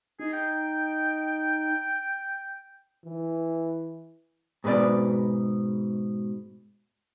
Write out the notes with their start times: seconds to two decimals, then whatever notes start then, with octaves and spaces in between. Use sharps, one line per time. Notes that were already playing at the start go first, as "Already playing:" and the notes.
0.20 D#4 G#4
0.33 G5
3.05 E3
4.64 G#2 B2 B4 D5